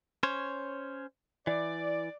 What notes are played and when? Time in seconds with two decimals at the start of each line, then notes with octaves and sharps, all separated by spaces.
0.23 C#4 C5 C#5
1.47 E3 D5